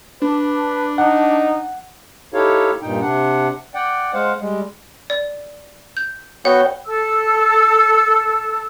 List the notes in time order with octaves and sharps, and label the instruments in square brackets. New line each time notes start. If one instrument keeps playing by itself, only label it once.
[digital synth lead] D4 [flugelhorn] B4
[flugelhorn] D#4 [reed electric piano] F#5
[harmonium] D#4 E4 G4 A4 C#5 F5
G2 A#2 D#4 G5
C3 D4 F#5
D5 F#5 G5
G#3 C5 F5 F#5
G3 G#3
[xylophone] D5
G6
[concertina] B3 F#4 [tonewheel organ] C#5 G5 [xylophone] F#5
[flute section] A4 A5 E6